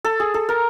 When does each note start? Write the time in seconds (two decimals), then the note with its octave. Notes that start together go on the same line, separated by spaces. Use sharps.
0.04 A4
0.20 G#4
0.34 A4
0.49 A#4